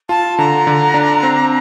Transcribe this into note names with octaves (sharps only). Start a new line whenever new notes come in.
F4 A5
D3 A#5
D3
D4
C4